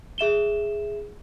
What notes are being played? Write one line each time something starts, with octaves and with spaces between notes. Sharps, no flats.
G#4 E5 E7 G7